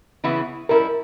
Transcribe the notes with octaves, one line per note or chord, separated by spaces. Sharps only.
C#3 E3 B3 E4
G3 C#4 E4 A#4